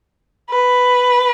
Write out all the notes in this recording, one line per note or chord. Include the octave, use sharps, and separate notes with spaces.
B4